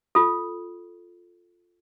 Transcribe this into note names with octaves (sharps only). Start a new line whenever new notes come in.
F4 A4